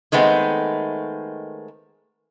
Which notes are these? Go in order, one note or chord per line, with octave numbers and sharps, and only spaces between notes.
D#3 G#3 A3 B3 C4